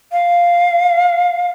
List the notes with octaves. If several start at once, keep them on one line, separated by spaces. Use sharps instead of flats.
F5